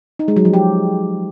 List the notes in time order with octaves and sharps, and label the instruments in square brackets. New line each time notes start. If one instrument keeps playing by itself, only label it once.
[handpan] D#4
G#3
F#3
F3
G4